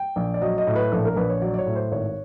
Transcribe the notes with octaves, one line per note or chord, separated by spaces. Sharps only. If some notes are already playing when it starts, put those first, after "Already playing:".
Already playing: G5
A#1
D5
F#3 D#5
D#5
A2
B4
A#1 A4
A#4
A#1 B4
C#5
F#3 D5
D5
C#5
A2
C5
G#1 C#5